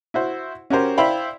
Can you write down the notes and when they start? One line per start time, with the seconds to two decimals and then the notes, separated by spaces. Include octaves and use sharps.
0.14 E4 F#4 C5
0.70 C#4 F#4 G4 A#4 C5
0.98 E4 C5 D5 F5 G5 B5